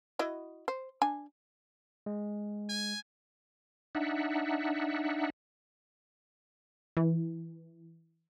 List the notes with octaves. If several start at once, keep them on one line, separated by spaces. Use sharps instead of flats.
E4 F#4 D#5
C5
D4 G#5
G#3
G#5
D4 D#4 E5 F#5
E3